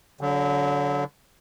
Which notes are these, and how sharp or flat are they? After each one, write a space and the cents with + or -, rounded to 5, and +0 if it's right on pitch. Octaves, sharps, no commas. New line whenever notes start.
D3 -30 F#3 +0